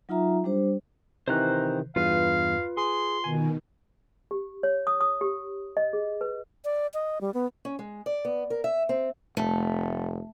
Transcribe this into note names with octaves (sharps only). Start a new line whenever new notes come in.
F#3 D#4 F4 E5 A#5
G3 D4 G4 C5
C3 D#3 E3 C5 A#5 F#6
E2 G2 F4 B4 F5
G#4 C6
B2 D#3 G#5
G4
C#5
D#6
D#6
G4
D#5
G#4
B4
D5
D#5
G3
B3
C#4
G#3
D5
B3
A#4
E5
C4
F1 A3